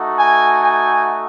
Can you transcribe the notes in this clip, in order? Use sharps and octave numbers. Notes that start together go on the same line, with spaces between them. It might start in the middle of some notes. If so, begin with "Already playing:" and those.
Already playing: A3 D#4 F#4
G#5
G#5